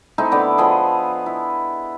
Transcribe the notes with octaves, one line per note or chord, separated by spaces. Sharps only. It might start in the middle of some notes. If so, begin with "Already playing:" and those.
A3 C4 D#4 E4
D3 B3 D5
F3 B3 G#4 D#5
E4